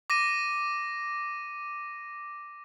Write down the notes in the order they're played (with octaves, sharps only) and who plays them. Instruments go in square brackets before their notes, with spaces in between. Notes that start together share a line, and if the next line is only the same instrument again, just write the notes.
[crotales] D6 A#6 D#7